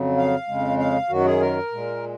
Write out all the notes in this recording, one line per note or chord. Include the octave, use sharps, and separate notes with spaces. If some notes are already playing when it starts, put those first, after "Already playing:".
Already playing: F2 C#3 F#3
F5
F2 C#3 G#3
F5
F#2 D#3 F#3 F#4
G#4
A#4
A#2 G#3